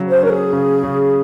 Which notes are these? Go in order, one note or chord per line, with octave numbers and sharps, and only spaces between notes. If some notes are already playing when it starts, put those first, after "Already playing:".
Already playing: C#3 F#3
C5
C#4 A#4
G#4
C#3
C#3